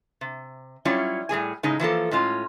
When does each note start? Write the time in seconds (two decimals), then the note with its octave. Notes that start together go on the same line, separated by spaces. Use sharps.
0.21 C3
0.85 F#3 G3 C#4 E4 F4
1.29 A2 G3 G#4 G#5
1.63 A2 C#3 G#3 D#4
1.80 E3 F3 A#3 A4
2.11 A2 G#3 C#4 F4